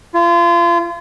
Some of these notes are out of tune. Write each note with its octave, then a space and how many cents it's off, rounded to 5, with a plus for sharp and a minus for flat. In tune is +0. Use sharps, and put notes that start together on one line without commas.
F4 -35